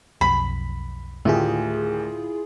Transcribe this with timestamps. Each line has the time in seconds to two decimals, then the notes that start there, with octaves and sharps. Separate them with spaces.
0.21 B1 F2 B5
1.25 D2 A2 D3 D#3 E4 F4 G4 G#4